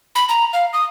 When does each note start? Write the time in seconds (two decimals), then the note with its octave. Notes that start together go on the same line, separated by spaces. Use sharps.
0.15 B5
0.29 A#5
0.53 F5
0.73 D#6